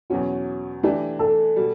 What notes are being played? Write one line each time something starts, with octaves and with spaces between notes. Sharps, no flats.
E2 B2 F#3 C#4 F#4
E3 A3 D4 G4
A4
B2 G3